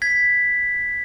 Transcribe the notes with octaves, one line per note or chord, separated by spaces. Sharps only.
G#6 B6